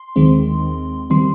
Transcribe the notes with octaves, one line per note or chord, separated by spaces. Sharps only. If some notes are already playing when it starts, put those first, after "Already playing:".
Already playing: C6
D#2 D#3 G#3 C4
D#3 G3 C4 C6